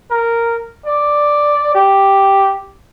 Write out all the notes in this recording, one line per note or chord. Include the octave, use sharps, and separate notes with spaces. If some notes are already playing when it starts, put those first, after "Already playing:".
A#4
D5
G4